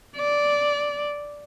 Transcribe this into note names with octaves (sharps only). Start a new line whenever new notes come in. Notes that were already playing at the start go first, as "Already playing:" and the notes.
D5